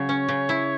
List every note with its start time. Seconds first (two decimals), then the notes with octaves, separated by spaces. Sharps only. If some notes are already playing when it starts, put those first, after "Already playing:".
Already playing: C#3 F#3 C#5
0.09 C#4
0.29 C#3
0.49 E4